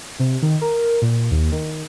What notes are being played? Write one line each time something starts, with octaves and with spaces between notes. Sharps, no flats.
C3
D#3
A#4
A#2
D#2
D#3